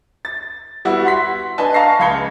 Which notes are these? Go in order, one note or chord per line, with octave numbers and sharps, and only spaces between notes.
A6
G3 B3 E4 F#4
F#5 C6 B6
D4 B4 D#5 G#5 A5
F5 A5 A#5 C#6 A#6 C7
C#2 F5 B5 G#6 C#7 G7